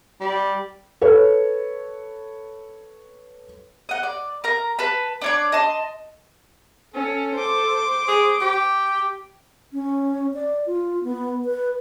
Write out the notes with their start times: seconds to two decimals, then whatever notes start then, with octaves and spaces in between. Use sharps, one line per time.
0.21 G3
1.01 A4 B4 C#5
3.89 D#5 F#5
4.03 D5
4.44 A#4 A#5
4.79 B4 A5 B5
5.21 D4 C#5 D5
5.52 D#5 A5 C6
6.94 C#4 A4
7.34 C5 D6
8.08 G#4
8.41 G4
9.73 C#4
10.34 D5
10.66 F4
11.04 B3
11.45 B4